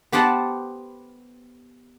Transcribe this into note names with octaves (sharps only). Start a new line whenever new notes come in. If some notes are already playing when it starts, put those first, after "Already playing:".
B3 G4 C5 F#5 A5